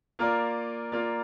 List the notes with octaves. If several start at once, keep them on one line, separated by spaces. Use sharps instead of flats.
A#3 F4 A#4 D5
A#3 F4 A#4 D5